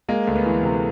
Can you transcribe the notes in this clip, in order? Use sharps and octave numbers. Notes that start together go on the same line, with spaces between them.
G#3 A#3
D2
B3
E3
C3